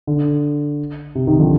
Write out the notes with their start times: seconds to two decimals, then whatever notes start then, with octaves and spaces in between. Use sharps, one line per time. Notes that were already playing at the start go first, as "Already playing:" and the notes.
0.07 D3
1.15 C3
1.27 C3 D#3
1.39 D3 F3